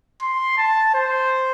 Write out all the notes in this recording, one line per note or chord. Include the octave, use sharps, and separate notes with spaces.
C6
A5
C5